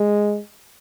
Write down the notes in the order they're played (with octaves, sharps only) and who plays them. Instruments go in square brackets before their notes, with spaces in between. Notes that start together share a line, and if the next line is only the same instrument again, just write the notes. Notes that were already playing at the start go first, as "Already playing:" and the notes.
Already playing: [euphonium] G#3